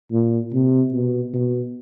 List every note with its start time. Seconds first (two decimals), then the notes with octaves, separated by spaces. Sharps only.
0.12 A#2
0.53 C3
0.93 B2
1.33 B2